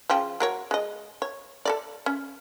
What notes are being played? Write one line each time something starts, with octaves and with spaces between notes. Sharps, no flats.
C#3 F3 G5
F#3 A#4 C#5
G#3 D#5
C#5
A4 A#4 D5
C#4